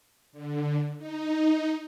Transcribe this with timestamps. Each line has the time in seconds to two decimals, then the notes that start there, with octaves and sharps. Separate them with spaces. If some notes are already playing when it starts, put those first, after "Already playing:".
0.32 D3
0.98 D#4